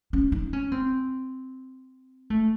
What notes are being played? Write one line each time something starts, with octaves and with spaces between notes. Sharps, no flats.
C#4
D#4
C#4
C4
A3